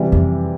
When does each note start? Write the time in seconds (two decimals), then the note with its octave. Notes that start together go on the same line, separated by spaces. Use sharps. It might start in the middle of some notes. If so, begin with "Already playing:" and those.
Already playing: C3 E3 G3
0.12 F2